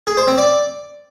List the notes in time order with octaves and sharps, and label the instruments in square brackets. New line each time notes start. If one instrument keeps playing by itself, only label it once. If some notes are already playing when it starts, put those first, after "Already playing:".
[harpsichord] G#4
C5
C4
D5